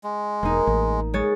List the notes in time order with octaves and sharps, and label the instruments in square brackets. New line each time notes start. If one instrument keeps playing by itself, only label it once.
[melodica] G#3
[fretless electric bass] E1 [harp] A#3 D#4
[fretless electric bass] A1
[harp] G#3 C#5 A6